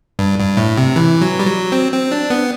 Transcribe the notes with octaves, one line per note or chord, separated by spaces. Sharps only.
G2
G2
A2
C3
E3
F#3
G3
F#3
C4
C4
D4
B3